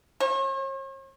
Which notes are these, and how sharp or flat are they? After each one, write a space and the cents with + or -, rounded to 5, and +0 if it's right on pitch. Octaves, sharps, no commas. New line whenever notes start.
C#5 -45